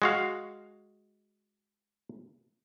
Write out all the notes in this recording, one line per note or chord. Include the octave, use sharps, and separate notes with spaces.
G#3 F#4 F5